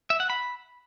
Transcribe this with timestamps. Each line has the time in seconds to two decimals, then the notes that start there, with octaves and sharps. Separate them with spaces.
0.10 E5
0.20 F#5
0.30 B5